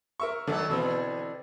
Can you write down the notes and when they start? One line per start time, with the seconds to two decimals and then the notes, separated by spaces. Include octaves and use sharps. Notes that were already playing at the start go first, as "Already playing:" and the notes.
0.20 A#4 E5 C#6
0.47 D3 D#3 F#3 A4
0.70 B2 D3 E3 C4